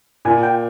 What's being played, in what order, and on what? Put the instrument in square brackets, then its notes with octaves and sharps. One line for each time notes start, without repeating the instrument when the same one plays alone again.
[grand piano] A#2 [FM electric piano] G#5
[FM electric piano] G5